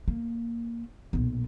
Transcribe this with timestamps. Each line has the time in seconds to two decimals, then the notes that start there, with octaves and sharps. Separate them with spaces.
0.08 A#3
1.13 B1 A#2